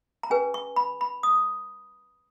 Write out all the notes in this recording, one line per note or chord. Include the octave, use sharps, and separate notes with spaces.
A#5
C#4 G#4 B4 G#5
C#6
B5
B5
D#6